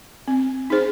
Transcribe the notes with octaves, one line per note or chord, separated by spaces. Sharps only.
C4
D#4 G#4 C5